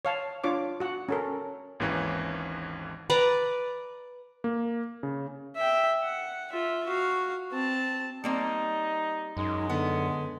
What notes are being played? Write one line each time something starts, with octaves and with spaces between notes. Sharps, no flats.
C#5 F5 A5
D4 F4 C#5 D6
F#4 F#5
C#4 A4 A#4
G#1 D#2 G#2 E3 C#4
B4 D5 A#5
A#3
C#3
E5 G5
F#5
F4 E5
F#4 F5
C4 A5
G3 A#3 C4 D#4
F#2 G#3 D#4
D3 B3